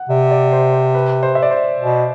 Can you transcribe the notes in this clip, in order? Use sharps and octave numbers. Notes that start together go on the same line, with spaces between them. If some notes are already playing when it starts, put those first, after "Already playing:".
Already playing: F#5
C3 D5
D5
C5
C5
B4
C5
E5
D5
C5
B2